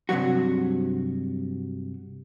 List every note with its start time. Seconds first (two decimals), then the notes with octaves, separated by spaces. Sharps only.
0.09 G2 C3 F3 F#3 F#4